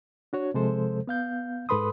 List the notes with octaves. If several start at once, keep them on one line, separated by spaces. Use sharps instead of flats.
D4 F#4 C#5
C3 F3 G#3 A4 C5
B3 F5 G6
G#2 A4 B4 B5 C6 D#6